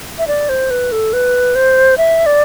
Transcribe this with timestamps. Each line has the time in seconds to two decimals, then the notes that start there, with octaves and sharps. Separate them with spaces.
0.19 E5
0.28 D5
0.49 C5
0.71 B4
0.92 A4
1.13 B4
1.55 C5
1.98 E5
2.26 D5